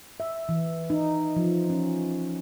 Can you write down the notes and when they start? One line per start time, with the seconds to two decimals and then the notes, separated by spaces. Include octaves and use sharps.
0.20 E5
0.49 E3
0.90 D#4
1.36 F3
1.70 C#4